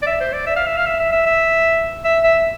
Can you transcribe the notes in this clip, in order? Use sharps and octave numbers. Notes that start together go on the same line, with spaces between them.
D5
E5
C5
D5
E5
F5
E5
F5
E5
E5
E5
E5
E5
E5